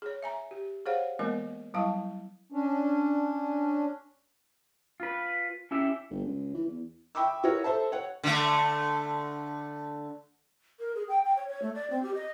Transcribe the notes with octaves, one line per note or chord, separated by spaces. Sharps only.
G#4 C#5
E5 G#5 A#5
G4
G#4 C5 C#5 F5 F#5
E3 G#3 A#3 B3 A#4 D#5
F#3 G3 E4 F5 A5
C#4 D4
F4 B4
C#4 E4 G4 E5
G1
C#2
E3
E2
E5 G5 B5 C#6 D6 E6
E4 F#4 A#4 B4 C#5
A4 C5 E5 A5
C#5 F#5
D3 A3
A#4
G#4
G5
G5
C#5
C#5
A3
D5
C4
G4
D#5